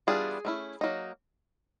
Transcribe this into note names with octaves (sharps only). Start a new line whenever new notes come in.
E3 G3 B3 D4 F4 G#4
A3 C#4 E4
F#3 A#3 D#4